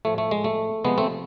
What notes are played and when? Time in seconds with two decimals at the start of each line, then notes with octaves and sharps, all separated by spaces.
0.05 A2 F3 A3
0.18 A3
0.31 G#3
0.44 A3
0.84 C3 F3 G#3 B3
0.98 A3 C4